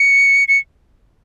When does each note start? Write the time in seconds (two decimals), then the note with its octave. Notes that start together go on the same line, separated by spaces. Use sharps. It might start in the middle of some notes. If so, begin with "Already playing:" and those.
Already playing: C#7
0.48 C#7